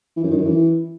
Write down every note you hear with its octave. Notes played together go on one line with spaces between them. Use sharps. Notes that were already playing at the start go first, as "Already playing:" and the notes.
E3
F#2
D#3
F#2
E3